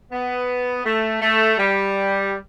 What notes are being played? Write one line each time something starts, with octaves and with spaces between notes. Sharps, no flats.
B3
A3
A3
G3